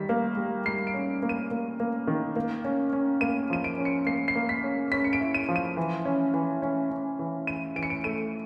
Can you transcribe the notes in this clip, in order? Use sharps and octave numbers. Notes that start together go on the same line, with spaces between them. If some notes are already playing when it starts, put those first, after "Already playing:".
Already playing: D#3 G3 B6
A#3
G3
G3 C7
D7
C#4
A#3
D#7
A#3
A#3
D#3
A#3
C#4
C#4
A#3 D#7
F3 D#7
D7
C#4
C#7
A#3 C7
C7
A#3
B6
C#4
C#4 B6
C#7
D7
E4
D#7
F3
D#7
E3
C#4
E3
C#4
C#4
E3
E3 D#7
E3 D7
C#7
D7
A3 D#7